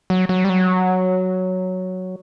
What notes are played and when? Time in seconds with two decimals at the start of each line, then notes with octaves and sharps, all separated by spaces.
0.10 F#3
0.29 F#3
0.45 G3
0.50 F#3